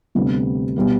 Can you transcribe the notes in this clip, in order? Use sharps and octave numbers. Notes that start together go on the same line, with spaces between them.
D2 C3 G3 B3
B2 G3 B3